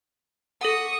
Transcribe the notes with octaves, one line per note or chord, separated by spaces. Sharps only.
A4 F#5 C#6 D#6